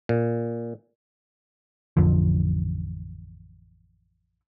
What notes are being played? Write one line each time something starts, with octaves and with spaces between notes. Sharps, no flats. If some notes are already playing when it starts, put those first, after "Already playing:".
A#2
A1 F2 D3 F3